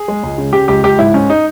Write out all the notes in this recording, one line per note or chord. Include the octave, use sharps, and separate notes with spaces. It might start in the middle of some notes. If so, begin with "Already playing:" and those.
Already playing: G#4
G#3
C#2
C#3
C#3 G4
C#2 G4
C#2 G4
G#2 E4
G#2 C#4
D#4